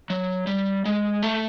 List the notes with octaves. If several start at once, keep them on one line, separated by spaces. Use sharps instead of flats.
F#3
G3
G#3
A3